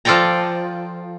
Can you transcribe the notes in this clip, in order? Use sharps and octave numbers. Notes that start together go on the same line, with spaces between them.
F3 F4 A4 D5 G5 A#5